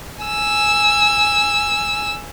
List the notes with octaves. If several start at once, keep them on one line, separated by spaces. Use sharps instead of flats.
G#5 E6